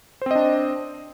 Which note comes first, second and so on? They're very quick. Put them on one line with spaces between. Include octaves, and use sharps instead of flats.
C5 C4 D#5 D4